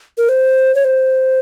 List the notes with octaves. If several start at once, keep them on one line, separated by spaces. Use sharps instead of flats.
A#4
C5
C#5
C5